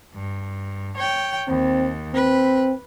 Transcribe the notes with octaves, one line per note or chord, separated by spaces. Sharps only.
G2
C#5 G5
D#2 C4
C4 B4